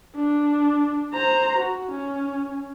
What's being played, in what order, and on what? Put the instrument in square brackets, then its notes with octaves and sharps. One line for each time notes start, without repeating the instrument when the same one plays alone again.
[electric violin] D4
C5 A#5
F#4
C#4